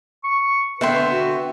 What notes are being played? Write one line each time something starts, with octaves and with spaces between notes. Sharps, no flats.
C#6
D3 B3 B4 E5 G5 C6
F#4